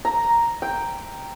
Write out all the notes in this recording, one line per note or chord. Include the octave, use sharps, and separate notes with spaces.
A#5
G5